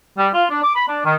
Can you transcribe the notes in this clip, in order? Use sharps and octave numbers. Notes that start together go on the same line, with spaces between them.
G3
F4
D4
D6
B5
D4
D#3